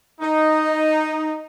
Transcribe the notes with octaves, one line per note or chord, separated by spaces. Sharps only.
D#4